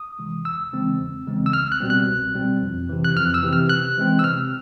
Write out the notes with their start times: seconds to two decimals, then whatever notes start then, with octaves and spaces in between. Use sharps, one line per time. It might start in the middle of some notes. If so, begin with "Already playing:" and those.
Already playing: D#6
0.19 C3 E3 G#3
0.45 E2 E6
0.73 C#3 E3 G#3 C4
1.00 E2
1.27 C#3 E3 G#3 C4
1.46 E6
1.53 C2 F6
1.72 F#6
1.80 B2 G3 C4
1.90 F#6
2.08 C2
2.35 B2 G3 C4
2.62 F2
2.89 C3 E3
3.05 F#6
3.15 F2 F6
3.34 E6
3.43 C3 E3
3.53 F6
3.70 C3 F#6
3.98 E3 G#3 C4
4.19 E6
4.24 C3 F6